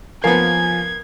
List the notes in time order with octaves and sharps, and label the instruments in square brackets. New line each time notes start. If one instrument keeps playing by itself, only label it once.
[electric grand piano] F3 G#5 C7 [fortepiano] A#3 B3 [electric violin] G#6